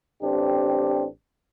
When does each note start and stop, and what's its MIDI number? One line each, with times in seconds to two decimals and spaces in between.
0.22 1.06 33
0.22 1.06 60
0.22 1.06 62
0.22 1.06 67